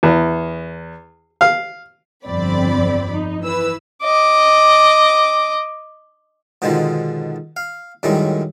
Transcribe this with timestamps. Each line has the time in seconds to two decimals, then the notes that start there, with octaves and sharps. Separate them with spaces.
0.03 E2
1.41 F5
2.25 G1 F2 C4 D5 B5
3.14 D#4
3.44 E3 B4 E6
4.03 D#5 D6
6.62 G#2 B2 D3 D#3 F3 G#3
7.57 F5
8.03 F#2 A2 D#3 G3 G#3